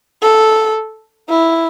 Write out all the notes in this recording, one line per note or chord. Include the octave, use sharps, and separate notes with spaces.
A4
E4